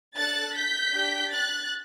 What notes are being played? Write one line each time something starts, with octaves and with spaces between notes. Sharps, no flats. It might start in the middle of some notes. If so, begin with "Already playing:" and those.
D4 A4 F#6 A6
G6 B6
D4 G4
F#6 A6